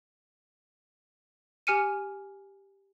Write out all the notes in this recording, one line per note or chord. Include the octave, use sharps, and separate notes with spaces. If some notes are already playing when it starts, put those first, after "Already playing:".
G4 G#5 F6 C#7 D#7